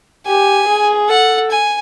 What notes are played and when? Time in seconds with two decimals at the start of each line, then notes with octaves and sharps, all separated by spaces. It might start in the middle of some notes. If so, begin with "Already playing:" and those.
0.26 G4 G#5
0.68 G#4
1.09 A4 F#5
1.51 G#5